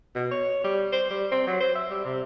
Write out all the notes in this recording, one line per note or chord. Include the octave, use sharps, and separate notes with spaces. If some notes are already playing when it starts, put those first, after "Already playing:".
B2
C#5
G3
C5
G3
C4
F#3
C5
E5
G3
C3